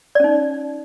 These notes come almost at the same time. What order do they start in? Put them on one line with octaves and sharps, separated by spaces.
D5 C#4 D#4